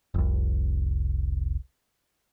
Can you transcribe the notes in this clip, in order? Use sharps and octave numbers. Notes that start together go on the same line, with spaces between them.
F1 C2